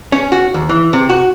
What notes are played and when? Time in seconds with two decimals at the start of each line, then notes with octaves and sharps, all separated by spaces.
0.12 C#4
0.32 F#4
0.54 D#2
0.69 E3
0.93 C3
1.10 F#4